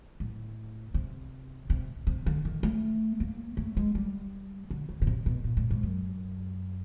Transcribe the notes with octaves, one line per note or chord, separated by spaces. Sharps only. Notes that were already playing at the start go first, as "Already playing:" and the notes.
A2
C3
C3
C3
D3
D#3
A3
A#3
A3
G#3
G3
D3
C#3
B2
C3
B2
A#2
A2
G#2
F#2